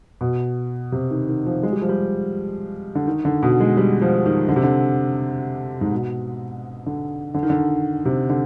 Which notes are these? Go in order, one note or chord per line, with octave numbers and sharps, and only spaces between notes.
B2
C3
D#3
D#3
F3
G#3
G3
F3
G3
D3
D#3
D3
B2
G#3
G3
F3
D#3
D3
C3
D3
G#2
B2
D3
D3
D#3
D3
C3
D3